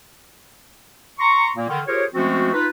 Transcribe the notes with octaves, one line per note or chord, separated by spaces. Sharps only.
A#5 C6 C#6
A#2 A#3
D3 D#3
F4 G4 G#4 A#4 C5 C#5
F3 G#3 A3 C4 C#4 F#4
D#4 F4 B4